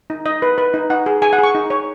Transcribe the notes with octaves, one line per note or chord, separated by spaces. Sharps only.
D#4
D#4 D#5
B4
B4
D#4
D#4 F#5
G#4
G#4 G#5
F#5
G#4 C#6
D#4
C#5